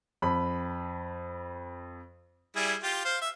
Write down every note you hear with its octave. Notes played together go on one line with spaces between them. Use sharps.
F2 B5
G3 E4 G#4
F4 G4
C5 F5
E5